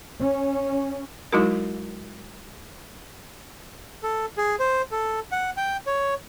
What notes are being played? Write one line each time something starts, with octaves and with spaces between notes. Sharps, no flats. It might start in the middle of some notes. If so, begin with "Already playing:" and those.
C#4
F#3 G#3 D#4 E4 F#4 A#4
A4
G#4
C5
A4
F#5
G5
C#5